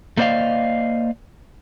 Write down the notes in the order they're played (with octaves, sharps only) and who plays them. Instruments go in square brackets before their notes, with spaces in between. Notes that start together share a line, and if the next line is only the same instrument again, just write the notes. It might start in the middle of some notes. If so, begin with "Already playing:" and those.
[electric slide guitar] A3 A#3 C5 D5 D#5 F5